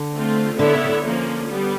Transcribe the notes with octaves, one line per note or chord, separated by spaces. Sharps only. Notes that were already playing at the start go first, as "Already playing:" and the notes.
Already playing: D3
A3 C4 F4
D3 B3 E4 A4 C#5 E5
C#3
D#3
D3
F3 A#3 C#4
G3 B3